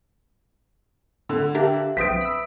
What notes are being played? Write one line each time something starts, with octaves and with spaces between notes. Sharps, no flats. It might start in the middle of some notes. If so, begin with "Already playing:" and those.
A2 D3
D4 G4 A#4 E5 F5
B1 C4 B4 E5 D#6 B6 D7
B5 E6